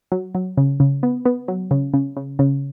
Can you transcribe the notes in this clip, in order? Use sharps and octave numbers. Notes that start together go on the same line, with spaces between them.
F#3
F#3
C#3
C#3
B3
B3
F#3
C#3
C#3
C#3
C#3